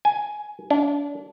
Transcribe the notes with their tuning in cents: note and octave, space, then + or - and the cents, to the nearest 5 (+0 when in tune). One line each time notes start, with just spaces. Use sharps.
G#5 +10
D4 -35